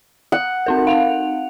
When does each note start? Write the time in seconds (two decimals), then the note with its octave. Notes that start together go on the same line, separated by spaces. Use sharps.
0.32 F#5
0.66 C4 D#4 A#4
0.87 F5 F7